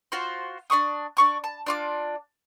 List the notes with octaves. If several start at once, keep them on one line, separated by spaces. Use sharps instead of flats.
F4 F#4 C5
D4 F5 C#6 D#6
D4 C#6 D6
A5
D4 F4 D6